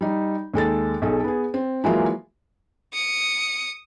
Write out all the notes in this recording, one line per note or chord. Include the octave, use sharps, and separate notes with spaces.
G3 D#4
D#2 G#3 A4 A6
B1 G#4 A4
B3 G#4
C4
E3 F#3 G#3 A#3 E4 F4
D#6 C#7